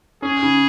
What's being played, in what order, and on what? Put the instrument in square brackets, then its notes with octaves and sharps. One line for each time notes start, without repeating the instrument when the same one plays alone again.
[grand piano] C#4 [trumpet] G#4
[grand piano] C#3